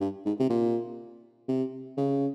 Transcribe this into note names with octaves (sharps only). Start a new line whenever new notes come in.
G2
G#2
C3
A#2
C3
C#3